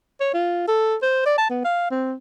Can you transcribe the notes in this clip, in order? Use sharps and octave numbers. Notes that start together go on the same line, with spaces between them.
C#5
F4
A4
C5
D5
A5
B3
F5
C4